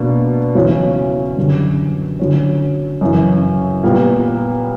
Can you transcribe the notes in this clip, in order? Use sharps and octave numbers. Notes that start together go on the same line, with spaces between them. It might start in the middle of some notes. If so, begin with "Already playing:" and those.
Already playing: B2 A#3 D4
E2 C#3 F#3 C#4
F#2 D3 G3
D3 F#3 C#4
F#2 C#3 E3
A#2 G3 B3